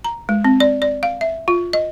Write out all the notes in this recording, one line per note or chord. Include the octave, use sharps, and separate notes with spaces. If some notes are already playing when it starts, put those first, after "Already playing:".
A#5
G#3
C4
D5
D5
F5
E5
F4
D#5